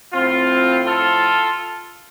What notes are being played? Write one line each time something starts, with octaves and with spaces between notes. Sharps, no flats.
A2 F3 C4 F4
F4 A4